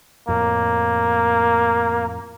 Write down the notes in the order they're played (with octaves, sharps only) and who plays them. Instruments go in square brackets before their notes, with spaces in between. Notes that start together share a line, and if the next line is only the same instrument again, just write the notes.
[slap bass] F2 A2 [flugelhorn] A#3